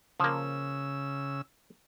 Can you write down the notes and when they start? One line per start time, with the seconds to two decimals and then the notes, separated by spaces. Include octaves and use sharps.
0.20 C#3 F3 A#3 E6